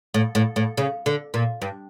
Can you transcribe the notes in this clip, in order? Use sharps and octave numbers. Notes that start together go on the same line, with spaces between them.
A2
A2
A2
C#3
D3
A#2
G2